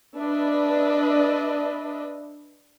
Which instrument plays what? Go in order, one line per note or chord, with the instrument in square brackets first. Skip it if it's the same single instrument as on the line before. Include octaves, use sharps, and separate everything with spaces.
[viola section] D4 B4 D#5 E5